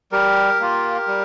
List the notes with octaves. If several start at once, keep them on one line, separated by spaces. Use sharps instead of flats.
G3 G4 A#4
A#3 F4
G3